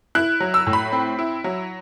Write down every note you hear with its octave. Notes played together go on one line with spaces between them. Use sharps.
E4 F#6
F#3
E6
A2
B5
C4
E4
F#3